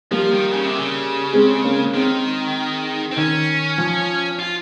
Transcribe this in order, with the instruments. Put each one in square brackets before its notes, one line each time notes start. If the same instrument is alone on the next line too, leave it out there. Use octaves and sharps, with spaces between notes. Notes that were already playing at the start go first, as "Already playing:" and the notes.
[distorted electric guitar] F3 [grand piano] G3 A#3
[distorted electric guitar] D#3
C#3
C3
C#3
[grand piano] G#3 C4
A#3 C#4
[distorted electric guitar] D#3 [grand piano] G#3 C4
[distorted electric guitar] C4
[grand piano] D#3 [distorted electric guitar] C#4
[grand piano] F3
[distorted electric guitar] F4